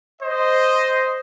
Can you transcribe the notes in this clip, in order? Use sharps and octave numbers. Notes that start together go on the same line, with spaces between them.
C5 D#5